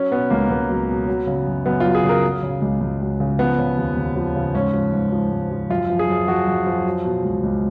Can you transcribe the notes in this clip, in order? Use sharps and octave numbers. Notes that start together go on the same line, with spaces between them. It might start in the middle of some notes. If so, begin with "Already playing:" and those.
Already playing: F#3 C#4
B2 B3
C#2 A#3
C#2 B3
F#3
B2
F#3
C#3
F#2
F#2 B3
F#3 F4
G#4
C#3
A#4
F#3
C#3
C#2
C#2
F#3
C#3
F3 B3
C#3
D#2
D#2
F3
C#3
G#2 C#4
F3
G#2
F3
G#2
F3
F#2 F4
F3
G#4
F#2
F3 F#4
F#2
F3
F#3
B2
C#2
C#2